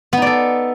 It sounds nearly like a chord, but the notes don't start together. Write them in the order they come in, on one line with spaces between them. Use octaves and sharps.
B3 D#4 D5 A4